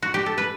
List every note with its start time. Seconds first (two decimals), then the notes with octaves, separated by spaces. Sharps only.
0.02 F#4
0.14 G4
0.26 A4
0.38 B4